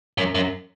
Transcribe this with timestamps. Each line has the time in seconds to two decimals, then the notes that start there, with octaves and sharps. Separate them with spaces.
0.18 F#2
0.35 F#2